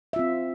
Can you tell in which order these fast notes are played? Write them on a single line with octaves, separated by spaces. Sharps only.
E5 F4 C4